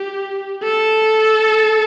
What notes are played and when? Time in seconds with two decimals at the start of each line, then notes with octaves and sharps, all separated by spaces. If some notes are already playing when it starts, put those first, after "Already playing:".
Already playing: G4
0.64 A4